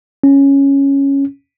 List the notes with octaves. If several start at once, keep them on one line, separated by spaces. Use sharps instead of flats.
C#4